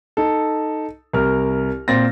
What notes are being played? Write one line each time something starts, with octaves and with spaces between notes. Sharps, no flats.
D#4 A4
C2 A#4 F6
A#2 C4 A6 A#6